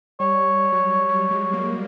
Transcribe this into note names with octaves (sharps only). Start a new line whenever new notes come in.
G3 C#5
G3
F#3
F#3
G3
G#3
A#3